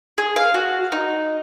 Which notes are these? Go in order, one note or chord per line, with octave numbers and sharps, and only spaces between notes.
G#4
F5
F#4
D#4